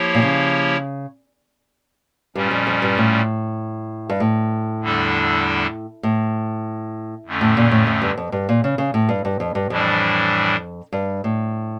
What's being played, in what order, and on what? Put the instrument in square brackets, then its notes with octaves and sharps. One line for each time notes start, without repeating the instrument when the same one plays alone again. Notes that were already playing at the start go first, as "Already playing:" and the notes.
Already playing: [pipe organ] F3 A#3 E4 G4 C#5
[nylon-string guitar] A#2
C#3
[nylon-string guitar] G2 [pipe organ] A#2 G3 C#4
[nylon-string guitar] F2
F2
G2
A2
G2
A2
[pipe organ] E2 D3 G3 D4 A4
[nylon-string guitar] A2
[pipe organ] F2 D3 A3 C#4
[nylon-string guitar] A2
A#2
A2
A2
G2
F2
G2
A#2
C#3
C#3
A2
G2
G2
F2
G2
[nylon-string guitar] F2 [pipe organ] A2 E3 G3 D4
[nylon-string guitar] G2
A2